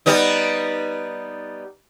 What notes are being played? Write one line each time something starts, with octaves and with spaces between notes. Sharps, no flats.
G3 B3 D#4